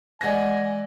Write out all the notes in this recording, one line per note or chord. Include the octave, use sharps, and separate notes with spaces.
E3 G#3 D5 F#5 G#5 A#6